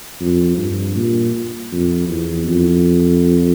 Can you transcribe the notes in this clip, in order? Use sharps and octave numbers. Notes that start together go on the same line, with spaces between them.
F2
G2
A#2
F2
E2
F2